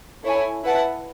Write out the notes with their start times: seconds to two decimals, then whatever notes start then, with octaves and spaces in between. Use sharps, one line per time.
0.23 E4 A4 C#5 E5 G#5
0.63 E4 B4 F#5 A5